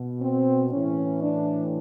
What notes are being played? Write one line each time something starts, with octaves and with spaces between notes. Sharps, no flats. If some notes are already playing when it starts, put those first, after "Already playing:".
Already playing: B2
C4
A2 E3 C#4
D4